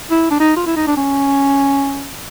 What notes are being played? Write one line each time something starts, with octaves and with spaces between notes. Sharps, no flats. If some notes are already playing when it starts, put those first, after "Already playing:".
E4
D4
D#4
F4
E4
D#4
D4
C#4